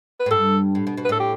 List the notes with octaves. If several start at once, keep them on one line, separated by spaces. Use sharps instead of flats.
B4
A2
G2 A4
A2
B2
B2
B4
A2 A4
G4